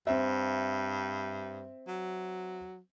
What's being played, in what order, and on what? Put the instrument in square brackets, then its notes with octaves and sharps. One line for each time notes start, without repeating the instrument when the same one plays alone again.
[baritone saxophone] G2 [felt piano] C4 E5
[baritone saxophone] F#3